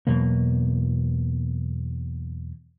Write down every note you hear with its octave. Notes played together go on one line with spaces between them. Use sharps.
E2 B2 F#3 A#3